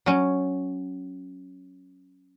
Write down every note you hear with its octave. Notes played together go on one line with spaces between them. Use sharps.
F#3 C#4